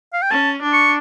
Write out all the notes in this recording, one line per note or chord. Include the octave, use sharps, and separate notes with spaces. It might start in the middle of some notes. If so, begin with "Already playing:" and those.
F5
G5
C#4 A5
D4
C#6